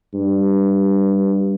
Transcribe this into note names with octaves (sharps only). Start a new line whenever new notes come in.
G2